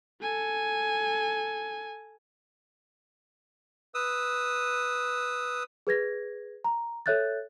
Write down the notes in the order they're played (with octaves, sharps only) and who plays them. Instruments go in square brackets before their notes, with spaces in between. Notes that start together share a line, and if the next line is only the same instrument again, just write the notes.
[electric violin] A4 G#5
[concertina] B4 D#6 E6
[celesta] G#4 B4 G#6 A#6
A#5
A4 C#5 E5 F#6 G6 A6